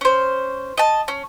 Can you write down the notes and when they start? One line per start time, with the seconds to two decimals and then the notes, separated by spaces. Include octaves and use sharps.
0.01 C#4 C5
0.77 D#5 A5
1.08 C#4